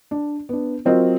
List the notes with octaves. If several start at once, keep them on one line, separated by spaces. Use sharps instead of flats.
D4
B3 D4
F#3 C4 F4 A#4 D#5